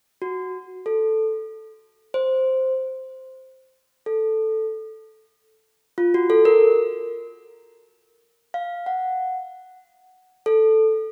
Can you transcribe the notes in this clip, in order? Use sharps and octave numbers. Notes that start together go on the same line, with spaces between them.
F#4
A4
C5
A4
F4
F#4
A4
A#4
F5
F#5
A4